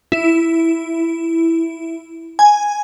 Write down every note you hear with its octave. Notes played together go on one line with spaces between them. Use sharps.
E4
G#5